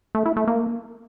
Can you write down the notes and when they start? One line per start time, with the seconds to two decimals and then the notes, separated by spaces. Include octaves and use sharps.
0.15 A3
0.26 E4
0.37 A3
0.48 A#3